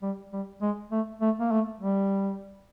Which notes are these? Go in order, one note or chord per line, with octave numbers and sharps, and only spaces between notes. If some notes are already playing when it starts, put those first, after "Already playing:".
G3
G3
G#3
A3
A3
A#3
A3
G3